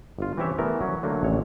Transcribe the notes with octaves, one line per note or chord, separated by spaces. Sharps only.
G1 F4
E3 C4 C#4 G4 C#5 E5
E3 G3 A3 B3 A#4
F#3 C#4
D3 F#3 A3 A#3
A1 A#2 C#5